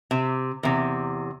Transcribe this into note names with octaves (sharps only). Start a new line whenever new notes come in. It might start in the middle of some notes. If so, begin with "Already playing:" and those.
C3
E2 C3